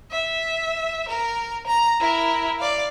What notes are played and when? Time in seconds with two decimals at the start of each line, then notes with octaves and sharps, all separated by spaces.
0.11 E5
1.08 A#4
1.66 A#5
2.01 E4 A#4
2.59 D5 F5